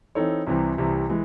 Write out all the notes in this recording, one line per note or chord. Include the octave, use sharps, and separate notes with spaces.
E3 C4 D#4 A4 C#5
C2 C3 E3
C2 C3 E3
E3 G#3